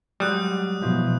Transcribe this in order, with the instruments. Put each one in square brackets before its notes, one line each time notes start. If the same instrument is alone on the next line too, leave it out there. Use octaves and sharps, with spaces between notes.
[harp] G#2 F#3 [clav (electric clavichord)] G3 [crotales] D#6 F#6
[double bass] B2 [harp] E3 F3